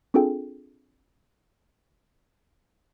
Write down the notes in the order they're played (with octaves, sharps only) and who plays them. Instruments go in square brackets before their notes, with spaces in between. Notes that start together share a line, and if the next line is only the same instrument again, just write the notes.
[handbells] C4 D4 F4 G#4 A4 G5